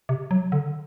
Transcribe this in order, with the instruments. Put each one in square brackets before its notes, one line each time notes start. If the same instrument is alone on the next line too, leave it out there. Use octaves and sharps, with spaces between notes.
[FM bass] C3
F#3
D3